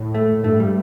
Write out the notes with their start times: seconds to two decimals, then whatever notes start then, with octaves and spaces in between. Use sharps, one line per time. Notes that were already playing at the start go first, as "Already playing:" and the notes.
Already playing: A2
0.15 A3
0.33 A2
0.44 G2 A3
0.60 G3